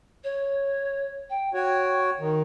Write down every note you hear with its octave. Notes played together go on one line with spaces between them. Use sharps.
C#5
G5
F#4 C#5 G5
D#3